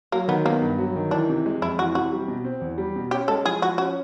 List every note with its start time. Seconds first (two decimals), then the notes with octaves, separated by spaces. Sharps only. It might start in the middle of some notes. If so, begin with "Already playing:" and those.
0.12 F#3 A#3
0.28 D#3 B3
0.45 A#3 B3
0.62 G2
0.78 F#3
0.96 D#3
1.11 E3 D4
1.29 C3
1.46 G#3
1.61 F2 E4
1.78 E3 F#4
1.95 C3 F#4
2.12 G3
2.28 B2
2.45 C4
2.61 E2
2.78 G3
2.96 B2
3.11 C#4 G4
3.28 G#3 A4
3.45 F3 G#4
3.62 F3 F#4
3.78 C#4 F#4